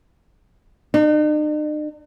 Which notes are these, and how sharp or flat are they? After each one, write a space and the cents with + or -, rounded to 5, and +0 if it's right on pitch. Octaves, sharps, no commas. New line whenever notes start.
D#4 -45